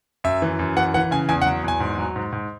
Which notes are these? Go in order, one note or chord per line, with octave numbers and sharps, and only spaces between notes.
F#2 E5
E3
F#2
E3 F#5
E3 F#5
C#3 G#5
E2 G#5
F#5
F#3
E2 G#5
G#2
F#3
G#2
G#2